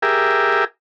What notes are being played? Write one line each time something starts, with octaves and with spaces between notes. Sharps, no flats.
G4 G#4 A#4 E5